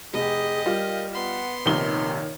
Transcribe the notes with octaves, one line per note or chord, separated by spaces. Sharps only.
F1 G4 G#4 D#5
G3 F4 A#4
B3 F#5 C6
A#1 C3 D#3 C#5 G7